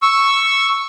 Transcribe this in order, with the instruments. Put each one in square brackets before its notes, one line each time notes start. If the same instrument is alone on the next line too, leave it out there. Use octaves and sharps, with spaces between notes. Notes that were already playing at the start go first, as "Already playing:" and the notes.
[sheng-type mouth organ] C#6 E6